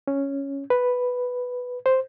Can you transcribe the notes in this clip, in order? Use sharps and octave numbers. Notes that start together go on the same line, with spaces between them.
C#4
B4
C5